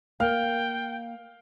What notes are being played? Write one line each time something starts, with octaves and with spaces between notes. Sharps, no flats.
A#3 F5 G5 F6